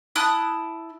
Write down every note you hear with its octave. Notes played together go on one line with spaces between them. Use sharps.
E4 A5 D#6 F#6